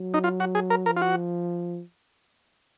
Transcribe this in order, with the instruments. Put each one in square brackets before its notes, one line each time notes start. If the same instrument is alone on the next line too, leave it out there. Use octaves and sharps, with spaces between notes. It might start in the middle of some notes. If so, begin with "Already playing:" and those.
Already playing: [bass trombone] F#3
[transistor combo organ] D#4
F4
F#4
G#4
A#4
[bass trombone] F3 [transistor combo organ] A#4
[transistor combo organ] F4
F#4